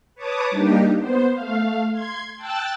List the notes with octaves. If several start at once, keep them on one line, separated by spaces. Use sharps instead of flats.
B4 C#5 A5 D6 D#6
G3 A#3 D4 D#4 G4
B3 C5
A3 F5
C6 G#6
G5 A5 E6 F#6 A6